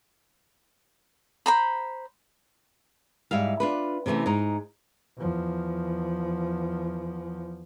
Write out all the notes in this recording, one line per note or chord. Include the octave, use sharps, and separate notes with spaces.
C5 A#5 B5
G#2 G3 E5 F5
D4 F4 B4
C3 E3 G3 A3 C#4
G#2 D#4
E2 F3